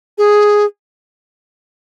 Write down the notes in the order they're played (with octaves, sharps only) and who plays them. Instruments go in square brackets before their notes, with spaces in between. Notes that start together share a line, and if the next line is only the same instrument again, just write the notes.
[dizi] G#4